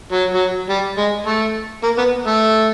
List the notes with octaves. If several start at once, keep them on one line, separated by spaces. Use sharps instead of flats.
F#3
F#3
G3
G#3
A3
A#3
B3
A3